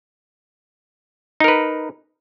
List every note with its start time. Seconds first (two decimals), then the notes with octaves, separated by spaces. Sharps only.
1.40 D#4
1.44 A#4
1.48 B4